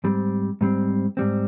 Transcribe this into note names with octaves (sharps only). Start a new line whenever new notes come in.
G#2 G3 C4
G#2 G3 C4
G#2 G3 C4